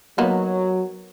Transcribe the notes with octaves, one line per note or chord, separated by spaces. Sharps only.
F#3 A#3 B3 D#4